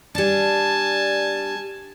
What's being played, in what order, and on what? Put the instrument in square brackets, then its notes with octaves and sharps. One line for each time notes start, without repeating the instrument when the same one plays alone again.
[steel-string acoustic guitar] G3 D4 [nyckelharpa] G#5 A5